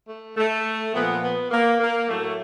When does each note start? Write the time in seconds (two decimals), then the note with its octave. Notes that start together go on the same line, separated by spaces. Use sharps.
0.08 A3
0.37 A3
0.93 A#2 F3 B3
1.22 B3
1.51 A#3
1.80 A#3
2.08 A2 F#3 A3